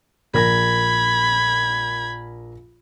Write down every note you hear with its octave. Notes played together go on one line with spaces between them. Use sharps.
A#1 A#4 B5 G#6 A#6